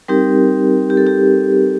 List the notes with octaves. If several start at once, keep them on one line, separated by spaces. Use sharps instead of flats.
G3 C4 D#4 G4 A#4
G4
A4
G4